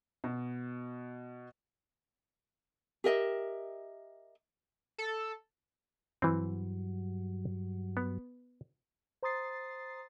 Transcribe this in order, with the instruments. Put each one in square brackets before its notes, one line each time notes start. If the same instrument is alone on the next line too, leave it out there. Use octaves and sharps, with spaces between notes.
[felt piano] B2
[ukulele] G4 A#4 D#5 E5
[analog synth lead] A4
[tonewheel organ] G2 F#3 [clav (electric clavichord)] E3 C4
[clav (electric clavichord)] B3
[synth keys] C5 A#5 C6 D#6 A6 C7